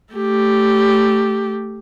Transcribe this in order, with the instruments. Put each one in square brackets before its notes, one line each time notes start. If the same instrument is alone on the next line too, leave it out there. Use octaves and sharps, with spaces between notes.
[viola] A3 G4